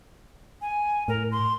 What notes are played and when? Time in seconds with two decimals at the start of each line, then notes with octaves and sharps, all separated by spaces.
0.61 G#5
1.08 A2 A#4
1.32 C6